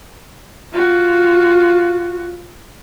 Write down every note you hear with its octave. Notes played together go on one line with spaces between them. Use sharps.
F4 F#4